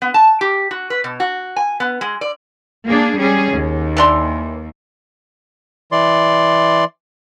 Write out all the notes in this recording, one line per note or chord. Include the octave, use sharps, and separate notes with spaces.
B3
A5
G4
F#4
B4
B2
F#4
G#5
B3
G#3
D5
A#3 D4 G#4
G3 C#4 G#4
D#2
E3 D4 C6
E3 D5 C6